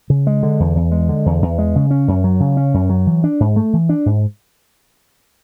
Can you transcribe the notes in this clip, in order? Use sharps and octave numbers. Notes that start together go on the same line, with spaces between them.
C#3
G#3
D3
E2
E2
G#3
D3
E2
E2
G#3
C#3
C#4
F#2
F#3
C#3
C#4
F#2
F#3
E3
D4
G#2
A3
E3
D4
G#2